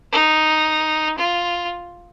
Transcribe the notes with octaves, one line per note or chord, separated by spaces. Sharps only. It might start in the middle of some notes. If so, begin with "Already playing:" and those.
D#4
F4